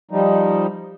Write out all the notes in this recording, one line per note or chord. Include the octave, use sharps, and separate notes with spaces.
F3 G3 D#4